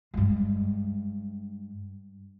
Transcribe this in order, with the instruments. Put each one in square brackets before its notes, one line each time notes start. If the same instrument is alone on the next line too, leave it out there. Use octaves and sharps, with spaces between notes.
[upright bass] G2 G#3